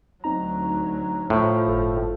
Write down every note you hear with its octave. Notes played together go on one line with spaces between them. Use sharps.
D2 F#3 C4 D#4 A#5
A2 F3
G1 A4